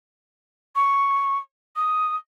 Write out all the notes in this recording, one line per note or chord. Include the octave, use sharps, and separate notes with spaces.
C#6
D#6